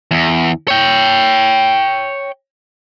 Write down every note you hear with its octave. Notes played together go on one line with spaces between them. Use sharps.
E2
C#5 G5